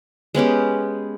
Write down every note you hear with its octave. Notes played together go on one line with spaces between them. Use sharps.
G#3 B3 C#4 G4